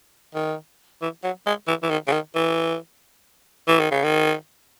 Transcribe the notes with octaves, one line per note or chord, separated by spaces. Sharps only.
D#3
E3
F#3
G#3
E3
E3
D#3
C#3
D#3
E3
E3
D#3
C#3
D#3